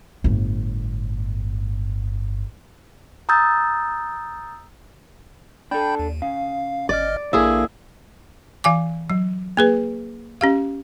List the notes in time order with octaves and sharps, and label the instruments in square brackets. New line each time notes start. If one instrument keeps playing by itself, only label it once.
[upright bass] G1 A2
[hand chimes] A#5 D#6 E6 G6 A6
[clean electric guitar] D4 A4 [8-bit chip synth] G5 B5 G6
[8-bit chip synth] D#2
[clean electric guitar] C#3 [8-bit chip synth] F5
[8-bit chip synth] G1 D#5 F6 [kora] D5
[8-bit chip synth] A#1 F5 [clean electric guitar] D3 A#3 [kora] E4 G#4
[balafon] E3 F5 G#5 D6
F#3
A#3 G#4 B4
C#4 G4 F5